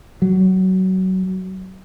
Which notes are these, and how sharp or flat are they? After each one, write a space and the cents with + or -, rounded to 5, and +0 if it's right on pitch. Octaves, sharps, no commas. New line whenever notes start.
F#3 +20